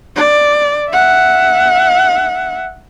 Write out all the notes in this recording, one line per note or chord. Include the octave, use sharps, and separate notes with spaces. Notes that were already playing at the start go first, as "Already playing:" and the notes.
D5
E5 F#5